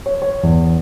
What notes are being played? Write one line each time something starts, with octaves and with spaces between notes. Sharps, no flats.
C#5
C#5
E2